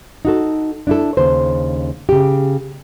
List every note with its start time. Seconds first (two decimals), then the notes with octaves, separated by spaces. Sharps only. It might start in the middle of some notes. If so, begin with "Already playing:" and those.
0.25 D#4 F#4 A4
0.87 D4 E4 A4
1.17 D#2 C#3 C5
2.09 C#3 G4